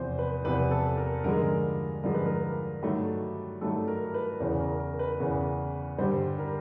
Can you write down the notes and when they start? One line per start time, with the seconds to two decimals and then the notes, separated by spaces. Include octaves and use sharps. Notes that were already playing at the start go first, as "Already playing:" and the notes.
Already playing: E2 C3 F3 C5
0.19 B4
0.45 E2 C3 F3 B4
0.71 A4
0.98 A#4
1.24 G2 D3 F3 G#3 A#4
2.03 G2 D3 F3 G#3 A#4
2.14 B4
2.26 A#4
2.82 G2 D#3 F#3 A3
3.61 G2 D#3 F#3 A3 A4
3.88 A#4
4.14 B4
4.40 E2 C#3 E3 C5
4.60 A#4
4.80 A#4
4.99 B4
5.20 E2 C#3 E3
5.98 G2 D3 G3 C5
6.38 A#4